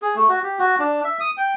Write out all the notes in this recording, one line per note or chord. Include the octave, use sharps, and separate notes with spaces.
G#4
A3
F#4
G4
F#4
D4
E5
D#6
G5